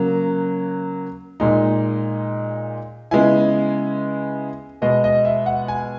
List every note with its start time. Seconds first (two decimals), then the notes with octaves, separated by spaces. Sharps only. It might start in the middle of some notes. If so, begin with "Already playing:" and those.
Already playing: C#3 F#3 A#3
1.40 A#2 G#3 D#4
3.11 C#3 G#3 B3 E4 G#5
4.82 B2 G#3 B3 D#5
5.04 D#5
5.25 E5
5.46 F#5
5.68 G#5